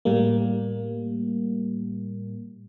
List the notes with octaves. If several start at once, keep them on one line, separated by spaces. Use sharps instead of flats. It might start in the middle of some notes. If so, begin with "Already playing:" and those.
A2 G3 A#3